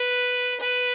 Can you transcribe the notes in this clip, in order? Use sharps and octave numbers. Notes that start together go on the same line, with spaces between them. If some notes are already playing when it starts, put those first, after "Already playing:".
Already playing: B4
B4